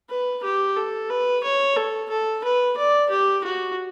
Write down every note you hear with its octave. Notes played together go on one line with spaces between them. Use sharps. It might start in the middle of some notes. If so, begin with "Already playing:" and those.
B4
G4
A4
B4
C#5
A4
A4
B4
D5
G4
F#4